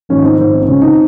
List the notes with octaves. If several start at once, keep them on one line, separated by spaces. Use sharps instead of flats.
A#1 G#2 D#3 C#4
C4 D#4
A#1 G#2 D#3 C4
C#2 C#3 C#4
C4 D#4